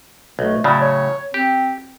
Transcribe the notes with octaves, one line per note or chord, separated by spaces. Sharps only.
B1 A3
A2 C#3 F#3 D5
C#5
C4 G4